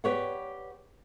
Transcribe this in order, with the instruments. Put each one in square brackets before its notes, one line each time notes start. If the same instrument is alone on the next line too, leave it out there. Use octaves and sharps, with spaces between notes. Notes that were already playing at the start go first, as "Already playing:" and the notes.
[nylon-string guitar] G4 B4 C#5 D5 F#5